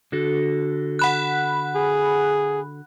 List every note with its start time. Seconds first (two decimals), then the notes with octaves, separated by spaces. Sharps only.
0.12 D3 F#4 A4
0.99 F#5 B5 F#6
1.76 G#4